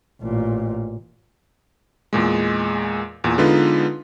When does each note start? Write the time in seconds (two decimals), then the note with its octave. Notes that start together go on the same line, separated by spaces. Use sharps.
0.22 A1 A#2
2.13 E2 A#2 G#3
3.24 E2 A#2
3.38 D3 G#3 B3 D#4 F4 B4